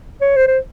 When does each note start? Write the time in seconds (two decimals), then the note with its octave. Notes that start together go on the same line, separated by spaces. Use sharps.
0.21 C#5
0.36 C5
0.48 C5